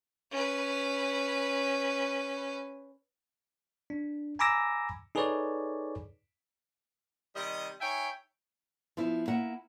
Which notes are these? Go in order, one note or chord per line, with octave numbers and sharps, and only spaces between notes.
C#4 B4
D4
G#5 A#5 B5 D6 E6 A#6
D#4 G#4 A4 B4 C#5 D5
C3 D#3 G3 D#5
D#4 C#5 E5 G5 G#5
F3 B3 E4
A#3 E4 F#5